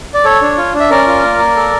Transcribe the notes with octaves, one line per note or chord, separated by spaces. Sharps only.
D5
A4 C#5
D4
F4
D4
E5
C#4 A#4 D5
F4
A#3
A#3
A4